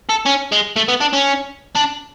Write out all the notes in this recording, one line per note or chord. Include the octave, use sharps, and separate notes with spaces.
A4
C#4
G#3
A3
B3
D4
C#4
D4